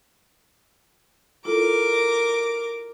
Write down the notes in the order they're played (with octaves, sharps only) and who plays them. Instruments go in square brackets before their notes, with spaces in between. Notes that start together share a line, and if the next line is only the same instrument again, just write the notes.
[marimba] E4 F4 A4 [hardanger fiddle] A#4 D6